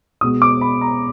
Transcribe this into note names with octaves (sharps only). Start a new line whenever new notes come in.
B2 G#3 B3 D#6
D6
B5
A#5